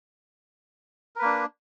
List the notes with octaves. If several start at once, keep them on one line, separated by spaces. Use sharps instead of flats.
A#3 D4 A#4 B4